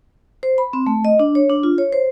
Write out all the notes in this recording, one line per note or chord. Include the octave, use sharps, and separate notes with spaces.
C5
B5
C4
A3
D#5
D4
C#5
D4
F4
C#5
C5